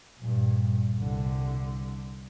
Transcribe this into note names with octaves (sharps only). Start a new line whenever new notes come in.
G2 A#2
C2 D3